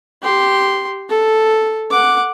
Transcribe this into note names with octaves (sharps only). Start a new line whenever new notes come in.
G4 C6
A4
F#5 D6